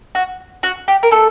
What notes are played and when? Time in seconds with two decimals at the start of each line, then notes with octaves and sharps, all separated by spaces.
0.15 F#4
0.63 F#4
0.88 G4
1.03 A#4
1.11 A3 A4